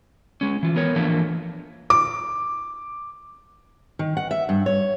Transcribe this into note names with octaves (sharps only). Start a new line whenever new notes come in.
G#3 C#4
E3 F4
B3 A#4 C#5
E3 F3 A3 A#3 D4
D6
D#3
F#5
E5
G2
C#5